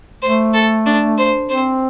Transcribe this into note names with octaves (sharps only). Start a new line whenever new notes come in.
A3 C5
A4
D4
C5
C4 C5